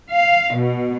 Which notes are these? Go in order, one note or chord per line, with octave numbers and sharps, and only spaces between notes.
F5
B2